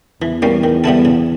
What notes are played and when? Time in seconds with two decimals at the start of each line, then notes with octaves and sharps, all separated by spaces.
0.21 E2 E3
0.42 G3 A#3 C#4
0.63 D#3
0.84 G3 B3 E4 A4
1.05 C#3